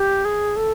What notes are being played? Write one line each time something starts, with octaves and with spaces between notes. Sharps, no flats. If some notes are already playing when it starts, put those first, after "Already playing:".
Already playing: G4
G#4
A4